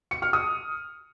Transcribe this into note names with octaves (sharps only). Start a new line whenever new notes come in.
C#7
F6
D#6